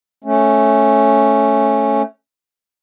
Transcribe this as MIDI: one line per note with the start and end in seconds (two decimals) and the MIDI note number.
0.24 2.02 57
0.24 2.02 61